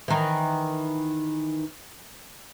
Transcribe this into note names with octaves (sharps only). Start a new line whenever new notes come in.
D#3 E3